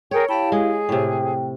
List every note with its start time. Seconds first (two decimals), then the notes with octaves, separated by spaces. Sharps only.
0.11 G#4 A#4 C#5 G5
0.29 E4 G4 F5 G5 A5 B5
0.52 G#3 G#4
0.89 A2 C3 G5